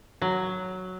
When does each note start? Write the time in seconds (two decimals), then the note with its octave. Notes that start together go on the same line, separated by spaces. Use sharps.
0.22 F#3